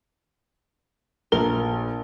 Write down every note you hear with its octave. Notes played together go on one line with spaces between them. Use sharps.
A#1 A#4 G7